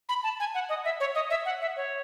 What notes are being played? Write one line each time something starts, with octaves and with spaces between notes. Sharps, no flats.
B5
A5
G#5
F#5
D#5
E5
C#5
D#5
E5
F#5
E5
C#5